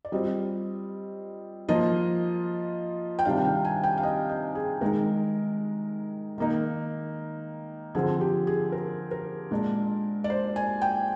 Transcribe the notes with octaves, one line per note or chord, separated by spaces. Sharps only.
D5
G3 C4 F4 D#5
F3 A#3 F4 D#5
G5
C3 D#3 G3 D4 F5
G5
G#5
G5
F5
D#5
D#5
G#4
D#3 G#3 D#4 A#4
D#3 A#3 D#4
D3 F3 C4 G#4
G4
G#4
A#4
A#4
A#2 G#3 D4
D5
C5
G#5
G5